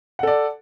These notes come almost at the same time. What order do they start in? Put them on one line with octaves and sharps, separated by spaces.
F#5 A4 D5